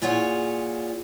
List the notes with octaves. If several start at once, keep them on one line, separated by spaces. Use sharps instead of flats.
A#2 F4 G#4 C#5 F#5